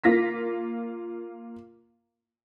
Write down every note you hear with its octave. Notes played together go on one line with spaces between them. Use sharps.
A#3 F4 A#6 B6